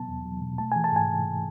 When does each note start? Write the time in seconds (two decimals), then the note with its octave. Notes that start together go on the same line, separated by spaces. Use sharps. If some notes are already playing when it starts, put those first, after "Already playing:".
Already playing: B2 F#3 B3 A5
0.09 E2
0.25 F#3
0.42 B2
0.58 A3 A5
0.72 E3 G#5
0.84 A5
0.92 G#2 G#5